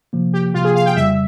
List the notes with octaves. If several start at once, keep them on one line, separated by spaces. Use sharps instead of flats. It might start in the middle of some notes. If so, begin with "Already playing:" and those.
C3 F3 A#3
G4
C3 F3 A#3 F4
G#4
F5
G5
F2 C#3 G3 E5